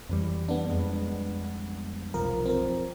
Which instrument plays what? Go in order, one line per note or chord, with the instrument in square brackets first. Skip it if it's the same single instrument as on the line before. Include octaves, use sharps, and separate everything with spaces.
[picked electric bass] F2 E3 G3
[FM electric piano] B3 D4
[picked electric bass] F2 G3 G#3
[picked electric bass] F1 B1 F3 [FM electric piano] A#4
[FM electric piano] C4 A#4